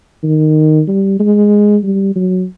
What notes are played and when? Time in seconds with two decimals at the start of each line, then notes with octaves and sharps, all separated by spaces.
0.23 D#3
0.88 G3
1.19 G#3
1.83 G3
2.16 F#3